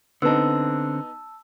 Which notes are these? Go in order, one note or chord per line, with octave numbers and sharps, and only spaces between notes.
D3 B3 C4 D#4 A5 E6